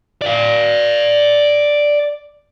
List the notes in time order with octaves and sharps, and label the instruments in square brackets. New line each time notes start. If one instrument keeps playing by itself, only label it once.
[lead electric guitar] D5 F5